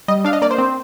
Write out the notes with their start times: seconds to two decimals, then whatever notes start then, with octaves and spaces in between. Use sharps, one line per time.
0.08 G3 D#5
0.25 D4 F5
0.33 D#5
0.42 A#3 D5
0.51 C5
0.58 C4